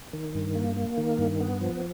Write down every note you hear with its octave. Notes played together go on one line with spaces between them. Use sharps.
D#3
G2
A#3
A#3
D#3
G2
B3
F3